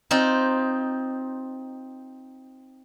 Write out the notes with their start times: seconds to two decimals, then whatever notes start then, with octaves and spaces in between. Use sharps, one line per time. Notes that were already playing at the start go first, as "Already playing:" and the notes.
0.11 C4 D#4 F4